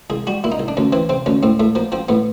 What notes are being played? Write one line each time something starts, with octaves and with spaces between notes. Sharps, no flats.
C2 G#4
G3 F#4
A#2 E4
D#4
C2
D4
D2 C#4
E3 C4
C3 C4
D2 C#4
A2 C4
A2 A3
F3 A#3
F3 C4
A2 B3